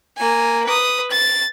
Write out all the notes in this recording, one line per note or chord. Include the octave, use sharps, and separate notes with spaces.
A#3 G#5
B4 D#6
A6